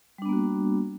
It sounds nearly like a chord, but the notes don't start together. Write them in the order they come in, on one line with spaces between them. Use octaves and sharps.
G3 D4 B3 A#3 F#4